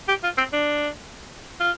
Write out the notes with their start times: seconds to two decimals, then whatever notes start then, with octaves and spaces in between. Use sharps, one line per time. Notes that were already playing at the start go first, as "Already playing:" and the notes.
0.08 G4
0.24 F4
0.38 C4
0.53 D4
1.60 F4